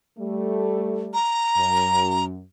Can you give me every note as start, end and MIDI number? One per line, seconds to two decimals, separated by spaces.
0.18 1.14 55
0.18 1.14 57
1.14 2.25 82
1.57 2.42 42